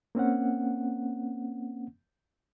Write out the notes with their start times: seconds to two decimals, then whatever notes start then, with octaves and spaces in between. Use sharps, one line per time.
0.15 A#3 C4 C#4 F#5